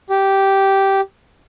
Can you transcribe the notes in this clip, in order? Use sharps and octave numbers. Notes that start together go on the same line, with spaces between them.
G4